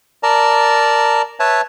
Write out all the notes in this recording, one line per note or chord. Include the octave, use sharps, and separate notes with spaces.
A#4 D5 A5 A#5
B4 C#5 E5 A5